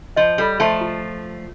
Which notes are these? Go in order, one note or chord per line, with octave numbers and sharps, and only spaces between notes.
F3 D#5
G3 A4
F3 A3 A5
F4